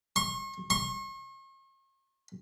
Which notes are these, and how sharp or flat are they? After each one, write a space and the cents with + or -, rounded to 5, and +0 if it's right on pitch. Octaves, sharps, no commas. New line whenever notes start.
C#6 -45
C#6 -45